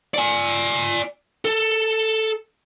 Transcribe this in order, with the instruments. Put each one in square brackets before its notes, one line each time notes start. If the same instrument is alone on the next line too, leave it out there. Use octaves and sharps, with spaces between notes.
[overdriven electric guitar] D5 G#5
A4